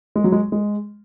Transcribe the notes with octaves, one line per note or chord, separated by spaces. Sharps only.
G#3
F#3
G#3
G#3